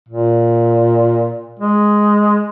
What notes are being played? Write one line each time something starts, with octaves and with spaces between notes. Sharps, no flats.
A#2
G#3